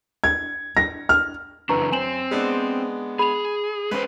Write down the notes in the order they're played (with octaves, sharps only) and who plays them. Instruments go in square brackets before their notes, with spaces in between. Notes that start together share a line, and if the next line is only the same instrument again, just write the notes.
[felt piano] G#6
A#6
F6
[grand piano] F#2 [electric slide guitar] C#3 E3 D4 [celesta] B4 A#5 C#6
[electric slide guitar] C4 C5 [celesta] G#5 E7 F#7
[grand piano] G#3 B3 D4
[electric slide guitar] G#4 [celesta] B5 F7
[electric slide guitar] G#3 C#4 C5 [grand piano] B4